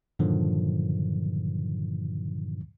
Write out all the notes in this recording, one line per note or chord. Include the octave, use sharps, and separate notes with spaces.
G2 A#2 D3 D#3 F3 F#3